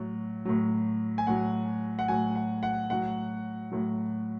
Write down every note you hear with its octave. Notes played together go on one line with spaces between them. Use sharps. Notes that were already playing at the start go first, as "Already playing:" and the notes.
Already playing: A2 F#3
A2 F#3
G#5
A2 F#3 F#5
F#5
A2 F#3 G#5
F#5
F#5
A2 F#3 F#5
A2 F#3